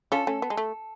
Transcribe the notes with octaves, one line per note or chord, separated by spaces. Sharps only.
C#4 F4 A4
A3 C#4
B3
G#3
A3